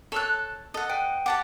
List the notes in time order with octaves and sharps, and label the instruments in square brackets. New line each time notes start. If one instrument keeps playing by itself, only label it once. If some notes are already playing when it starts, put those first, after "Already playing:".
[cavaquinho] A4 A5 [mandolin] C#5 E6 F#6
[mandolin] A4 [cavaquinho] D#5 F#5
[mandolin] B4 [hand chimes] G5 D7
[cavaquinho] G4 A5 D6 [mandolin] F#5